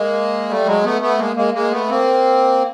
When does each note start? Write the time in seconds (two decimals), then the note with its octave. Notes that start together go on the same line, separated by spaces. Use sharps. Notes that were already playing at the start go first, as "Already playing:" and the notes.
Already playing: G#3 A#3
0.49 G3 A3
0.66 F#3 G#3
0.84 A3 B3
1.01 A3 B3
1.18 G#3 A#3
1.36 G#3 A#3
1.54 G#3 A#3
1.71 A3 B3
1.89 A#3 C4